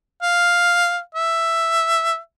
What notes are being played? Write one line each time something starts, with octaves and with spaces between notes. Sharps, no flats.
F5
E5